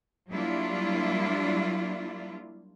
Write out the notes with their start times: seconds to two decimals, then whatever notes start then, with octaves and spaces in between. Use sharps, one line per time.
0.29 F#3 G3 A#3 D4 E4 F4